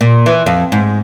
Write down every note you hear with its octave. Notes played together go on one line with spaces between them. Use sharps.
A#2
E3
F2
G#2